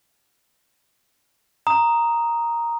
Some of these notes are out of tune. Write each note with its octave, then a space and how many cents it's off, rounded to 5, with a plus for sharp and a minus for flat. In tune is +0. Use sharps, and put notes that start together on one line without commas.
A#5 +0 D#6 +0